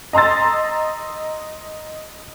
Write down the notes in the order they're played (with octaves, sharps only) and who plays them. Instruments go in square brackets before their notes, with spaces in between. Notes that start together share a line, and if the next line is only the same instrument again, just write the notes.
[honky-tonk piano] D#5 A#5 C6 E6 A6